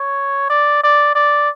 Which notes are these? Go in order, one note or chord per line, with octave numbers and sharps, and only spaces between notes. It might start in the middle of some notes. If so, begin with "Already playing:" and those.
Already playing: C#5
D5
D5
D5